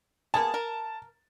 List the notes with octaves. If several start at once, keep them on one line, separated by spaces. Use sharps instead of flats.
A#3 B3 G#4 A5
A#4